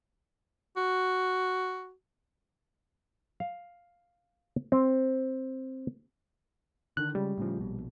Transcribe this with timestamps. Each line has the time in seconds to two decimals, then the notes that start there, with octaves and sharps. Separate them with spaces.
0.77 F#4
3.40 F5
4.72 C4
6.97 D3 D#3 F#6
7.15 C#3 G3 G#3
7.38 A2 C#3 F3
7.58 A#1 B2